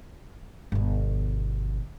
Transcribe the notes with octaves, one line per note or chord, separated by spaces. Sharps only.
G1 B2